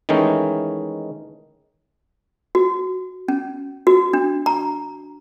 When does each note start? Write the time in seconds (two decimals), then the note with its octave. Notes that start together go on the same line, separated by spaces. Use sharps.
0.09 D#3 E3 G#3 A3 C#4 D#4
2.55 F#4
3.28 C#4
3.87 F#4
4.13 D4
4.46 A#5